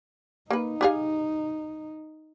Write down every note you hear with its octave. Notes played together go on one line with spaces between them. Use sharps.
A#3 D#4 B4
G4 G#4 F5